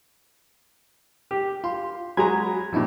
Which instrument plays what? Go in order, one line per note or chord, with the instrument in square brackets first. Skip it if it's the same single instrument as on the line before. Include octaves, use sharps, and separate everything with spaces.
[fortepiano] G4
[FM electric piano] F4 [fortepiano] C6
[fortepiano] F#3 G#3 A#5 [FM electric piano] G#5 B5 G#6
[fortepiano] G2 A#2 [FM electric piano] F3 D#4 E4